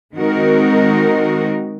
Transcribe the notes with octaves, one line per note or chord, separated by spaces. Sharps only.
D#3 G#3 C4 D#4 F#4 A#4